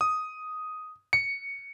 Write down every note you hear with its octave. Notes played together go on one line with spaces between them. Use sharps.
D#6
C#7